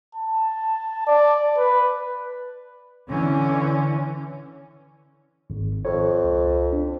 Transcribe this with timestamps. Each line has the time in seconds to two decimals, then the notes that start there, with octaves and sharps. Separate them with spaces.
0.15 A5
1.07 D5
1.57 B4
3.08 D3 E3 C#4
5.50 G#1
5.85 F2 C#5
6.24 C#2
6.73 D4